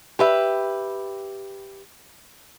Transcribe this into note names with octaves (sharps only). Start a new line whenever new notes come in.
G4 B4 E5